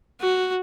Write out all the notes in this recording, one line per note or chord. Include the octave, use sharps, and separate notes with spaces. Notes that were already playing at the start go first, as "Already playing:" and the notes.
F#4